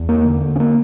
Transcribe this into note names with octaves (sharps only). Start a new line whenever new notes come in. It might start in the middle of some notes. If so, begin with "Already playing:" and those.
Already playing: E2
A#3
D3
C#4
A#3